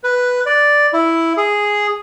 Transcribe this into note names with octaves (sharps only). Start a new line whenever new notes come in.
B4
D5
E4
G#4